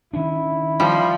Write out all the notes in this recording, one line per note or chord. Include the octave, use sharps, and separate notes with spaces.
D#3 C#4 D4 E4
F3 G3